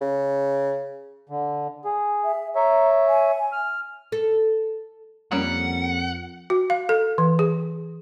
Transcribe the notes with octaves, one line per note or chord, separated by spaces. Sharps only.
C#3
D3
G#4
E5
C#5 E5 A#5
G#5
F6
A4
F2 G3 A#3 C#4 F#5
F#4
F5
A4
E3
G#4